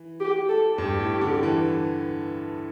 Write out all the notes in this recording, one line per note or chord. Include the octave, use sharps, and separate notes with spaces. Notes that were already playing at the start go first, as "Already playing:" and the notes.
Already playing: E3
G4
A4
G2 G4
A2
D3
E3